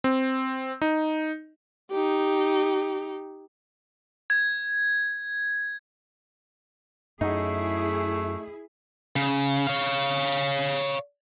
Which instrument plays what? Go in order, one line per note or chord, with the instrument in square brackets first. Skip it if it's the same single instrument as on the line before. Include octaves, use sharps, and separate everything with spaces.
[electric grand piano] C4
D#4
[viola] D#4 G4
[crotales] G#6
[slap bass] F#2 [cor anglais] A3 [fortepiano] D#4 [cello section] E4 G#4
[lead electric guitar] C#3
C#5 F5